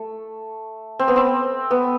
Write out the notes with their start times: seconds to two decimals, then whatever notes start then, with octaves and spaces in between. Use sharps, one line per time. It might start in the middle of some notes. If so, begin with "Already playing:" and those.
Already playing: A3
0.99 C4
1.08 B3
1.16 C4
1.71 B3